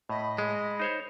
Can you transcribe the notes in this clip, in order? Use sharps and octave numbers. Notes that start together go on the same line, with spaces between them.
A2 D#5 B5
G#3
D#4 C5 C#5